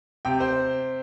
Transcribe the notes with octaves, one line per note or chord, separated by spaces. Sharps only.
C3 G5
C5